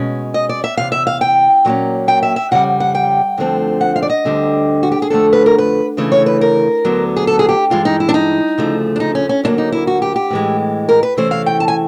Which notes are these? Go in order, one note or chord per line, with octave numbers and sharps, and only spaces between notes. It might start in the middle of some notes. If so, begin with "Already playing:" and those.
Already playing: B2 G#3 C#4
D#5
D5
E5
E2 C3 F5
E5
F5
G5
A#2 F#3 A#3 C#4
G5
E5
E5
F2 C#3 G3 F#5
F#5
G5
D2 D3 F3 A3 C4
F#5
F5
D5
D#5
D2 D3 G3 C4
F#4
G4
G#4
F2 D3 F3 A3 A4
B4
A#4
B4
D2 C#3 E3 A3
C#5
B4
A#4
D2 D3 F#3 B3
G#4
A4
G#4
G4
G2 E3 G#3 F4
D#4
E4
D4
D#4
D2 C#3 F3 A3
D4
D#4
C#4
C#4
D2 D3 F#3 A#3 C#4 D4
D#4
E4
F#4
G4
G4
A2 E3 G#3
A#4
B4
E2 C3 E3 A3 C#4 C5
F5
G5
A5
G#5